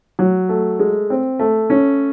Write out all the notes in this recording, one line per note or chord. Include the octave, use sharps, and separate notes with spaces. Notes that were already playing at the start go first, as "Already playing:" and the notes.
F#3
A3
G#3
C4
A3
C#4